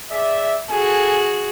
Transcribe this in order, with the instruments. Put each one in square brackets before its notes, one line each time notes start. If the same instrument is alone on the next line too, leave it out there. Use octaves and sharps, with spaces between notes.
[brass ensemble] G#4 D5 E5
[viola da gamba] F#4 G#4 [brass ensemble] A4 G#5